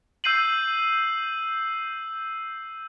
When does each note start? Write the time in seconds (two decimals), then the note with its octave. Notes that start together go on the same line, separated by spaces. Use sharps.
0.24 E6 G6 C7 D#7 F#7